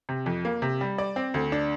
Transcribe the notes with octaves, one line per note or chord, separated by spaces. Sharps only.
C3
F2
A#3
C3
G3
D5
C4
D2
D4